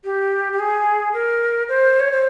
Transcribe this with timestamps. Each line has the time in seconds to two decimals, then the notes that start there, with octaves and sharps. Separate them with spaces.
0.04 G4
0.53 G4
0.59 G#4
1.14 A#4
1.68 C5
2.00 C#5
2.12 C5